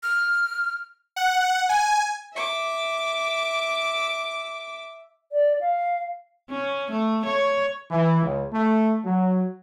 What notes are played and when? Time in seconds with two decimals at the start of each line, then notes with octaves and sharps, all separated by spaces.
0.03 F6
1.16 F#5
1.69 G#5
2.33 E5 D6
5.32 D5
5.61 F5
6.50 C#4
6.91 A3
7.26 C#5
7.91 E3
8.22 C#2
8.53 A3
9.05 F#3